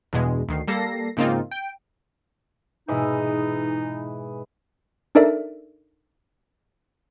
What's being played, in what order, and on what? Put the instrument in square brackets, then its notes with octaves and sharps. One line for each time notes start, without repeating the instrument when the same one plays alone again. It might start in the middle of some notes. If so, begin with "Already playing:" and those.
[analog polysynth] E2 G2 B2 G#3
D2 D#3 C7
G3 A#3 A4 A#6 C7
G#2 C#3 A#3 C4 D#4 F4
G5 D7
[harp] G#2 B2 G#3 [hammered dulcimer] E3 B4 D#5 [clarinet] D#4
[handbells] D4 D#4 A4 A#4 D5 E5